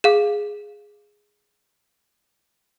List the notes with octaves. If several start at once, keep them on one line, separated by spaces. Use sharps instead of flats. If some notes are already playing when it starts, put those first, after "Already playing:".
G#4 F5